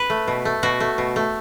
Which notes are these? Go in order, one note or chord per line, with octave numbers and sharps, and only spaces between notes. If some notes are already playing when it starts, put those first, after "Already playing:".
Already playing: B4
A3
B2
A3
B2 F#4
A3
B2
A3